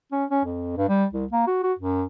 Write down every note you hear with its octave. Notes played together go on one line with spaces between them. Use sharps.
C#4
C#4
F2
G2
G3
C2
A#3
F#4
F#4
F#2